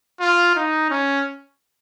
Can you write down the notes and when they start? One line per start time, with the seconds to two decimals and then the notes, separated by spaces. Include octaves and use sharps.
0.20 F4
0.56 D#4
0.90 C#4